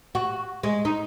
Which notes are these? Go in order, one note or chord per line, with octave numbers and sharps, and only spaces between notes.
F#4
G#3
D#4